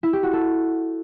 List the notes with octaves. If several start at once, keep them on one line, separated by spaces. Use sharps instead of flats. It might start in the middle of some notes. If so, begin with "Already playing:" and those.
E4
G4
F#4
A4